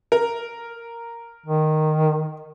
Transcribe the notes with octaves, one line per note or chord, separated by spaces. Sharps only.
A#4
D#3